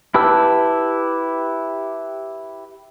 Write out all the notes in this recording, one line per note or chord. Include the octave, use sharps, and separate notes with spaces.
E4 G4 B4 A5 E6